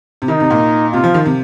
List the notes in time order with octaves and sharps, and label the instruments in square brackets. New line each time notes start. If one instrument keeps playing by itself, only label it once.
[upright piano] C3
[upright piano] D#3 [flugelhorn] D#4
[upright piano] C3
A#2
[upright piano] C3 [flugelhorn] F4
[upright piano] F3
D#3
C3